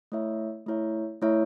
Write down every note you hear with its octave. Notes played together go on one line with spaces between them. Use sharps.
A3 E4 C#5 E5
A3 E4 C#5 E5
A3 E4 C#5 E5